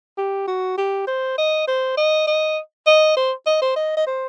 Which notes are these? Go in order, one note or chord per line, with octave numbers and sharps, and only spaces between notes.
G4
F#4
G4
C5
D#5
C5
D#5
D#5
D#5
C5
D#5
C5
D#5
D#5
C5